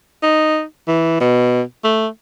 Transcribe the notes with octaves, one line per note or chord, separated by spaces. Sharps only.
D#4
E3
B2
A3